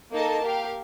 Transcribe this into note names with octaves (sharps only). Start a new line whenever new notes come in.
A#3 D#4 A4 D#5 A5
G4 A#4 F5